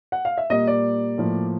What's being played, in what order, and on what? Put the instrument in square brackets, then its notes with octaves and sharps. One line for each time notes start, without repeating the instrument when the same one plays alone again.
[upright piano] F#5
F5
E5
A#2 G3 A#3 D#5
D5
A2 F3 A#3